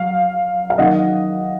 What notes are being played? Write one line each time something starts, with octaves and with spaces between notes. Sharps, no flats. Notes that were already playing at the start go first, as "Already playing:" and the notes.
Already playing: F#3 F5
F5
D#3 F#3 A#3 D#5 F#5